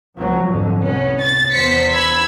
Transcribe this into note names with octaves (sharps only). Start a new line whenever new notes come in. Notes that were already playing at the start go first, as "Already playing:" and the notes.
C#2 F3 F#3
F2 G#2 D3
C2 B3 C#4
A6
E2 C5 B6 C#7
B5 E6 G#6